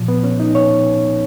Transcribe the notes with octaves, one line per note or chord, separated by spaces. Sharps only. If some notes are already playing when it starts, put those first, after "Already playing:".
Already playing: A#2 F3
B3
C#4
D#4
C#5